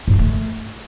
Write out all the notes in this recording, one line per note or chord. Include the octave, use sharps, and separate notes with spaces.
G#2
A#3
A3